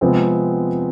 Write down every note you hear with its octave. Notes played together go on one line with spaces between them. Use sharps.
C3 F3 G#3 B3 C4